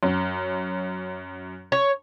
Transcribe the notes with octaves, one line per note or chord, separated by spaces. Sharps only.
F#2 C#4
C#5